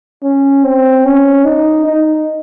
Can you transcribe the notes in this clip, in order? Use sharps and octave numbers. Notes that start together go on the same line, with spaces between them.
C#4
C4
C#4
D#4
D#4